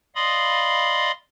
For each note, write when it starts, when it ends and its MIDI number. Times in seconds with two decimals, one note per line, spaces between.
0.15 1.12 74
0.15 1.12 75
0.15 1.12 77
0.15 1.12 83
0.15 1.12 84
0.15 1.12 87